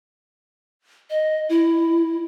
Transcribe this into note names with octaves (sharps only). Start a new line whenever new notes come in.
D#5
E4